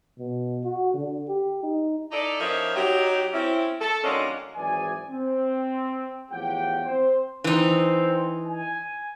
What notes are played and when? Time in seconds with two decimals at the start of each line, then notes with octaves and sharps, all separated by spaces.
0.19 B2
0.64 F#4
0.94 D3
1.28 G4
1.63 D#4
2.11 D#4 E4 A4 D5
2.40 F3 C#4 D#4 G4 A#4 E5
2.76 F#3 D#4 G4
3.32 C4 C#4 E4
3.81 A4
4.04 D#3 F#3 G#3 A#3 C#4 D4
4.55 G#1 E3 F#3 G#4 D5 G#5
5.09 C4
6.31 E2 A2 F3 G4 F#5 G5
6.86 C4 C5
7.44 E3 C4 D#4
8.45 G#5